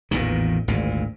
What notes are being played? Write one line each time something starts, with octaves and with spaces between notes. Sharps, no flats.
A1 E2 A#2 D#3
G#1 D2 A#2